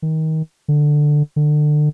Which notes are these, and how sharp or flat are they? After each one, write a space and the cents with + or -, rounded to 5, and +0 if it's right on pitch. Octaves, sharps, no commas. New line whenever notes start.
D#3 +25
D3 +10
D3 +30